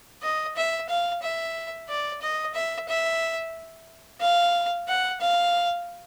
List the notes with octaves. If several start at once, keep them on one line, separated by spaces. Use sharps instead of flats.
D#5
E5
F5
E5
D5
D#5
E5
E5
F5
F#5
F5